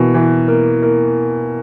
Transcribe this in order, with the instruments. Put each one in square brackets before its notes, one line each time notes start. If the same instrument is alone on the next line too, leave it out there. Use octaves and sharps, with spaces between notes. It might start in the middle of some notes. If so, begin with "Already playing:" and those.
Already playing: [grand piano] B2 [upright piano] E3 A#3
[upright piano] E3
A#3
A#3